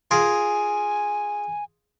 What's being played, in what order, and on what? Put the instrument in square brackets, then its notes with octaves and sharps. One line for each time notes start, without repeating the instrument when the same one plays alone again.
[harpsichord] F4 G#4 A#4 [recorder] G#5